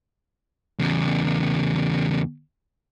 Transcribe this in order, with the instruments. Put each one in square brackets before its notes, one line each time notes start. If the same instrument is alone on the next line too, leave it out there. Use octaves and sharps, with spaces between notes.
[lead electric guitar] E2 C#3